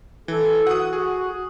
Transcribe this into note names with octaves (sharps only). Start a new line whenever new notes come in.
E3 A4
F#4 F#5 D#6
G#4